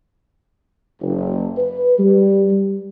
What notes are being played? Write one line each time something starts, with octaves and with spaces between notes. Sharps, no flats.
F#1
B4
G3
G3